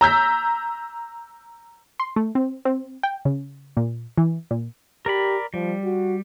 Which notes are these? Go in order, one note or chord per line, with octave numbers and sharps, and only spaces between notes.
A#5 E6 G6 B6
C6
A3
C4
C4
G5
C#3
A#2
E3
A#2
G4 A#4 D5 B5
F3 G3
F#4